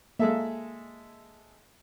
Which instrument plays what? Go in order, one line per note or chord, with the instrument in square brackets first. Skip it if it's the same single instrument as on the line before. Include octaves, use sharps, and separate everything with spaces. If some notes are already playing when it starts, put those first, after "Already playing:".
[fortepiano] G#3 A4 E5 [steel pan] A#3